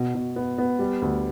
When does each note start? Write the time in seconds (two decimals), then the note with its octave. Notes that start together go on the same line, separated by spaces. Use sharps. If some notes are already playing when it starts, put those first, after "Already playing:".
Already playing: B2
0.14 B2
0.36 B3
0.58 B3
0.79 G3
1.02 D2